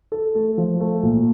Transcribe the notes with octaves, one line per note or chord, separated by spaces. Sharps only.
A4
A3
F3
A3
A#2